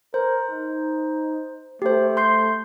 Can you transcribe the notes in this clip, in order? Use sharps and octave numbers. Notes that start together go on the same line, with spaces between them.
A#4 C5
D#4
A3 G4 C5
C6 G6 C7